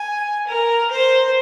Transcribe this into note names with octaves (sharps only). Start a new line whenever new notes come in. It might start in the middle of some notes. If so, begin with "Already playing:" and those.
Already playing: G#5
A#4
C5